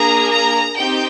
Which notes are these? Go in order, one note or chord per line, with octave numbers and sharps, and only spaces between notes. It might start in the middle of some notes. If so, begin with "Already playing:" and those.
Already playing: A#3 D4 G#4 A#5
A#5
C4 D#4 G4 G5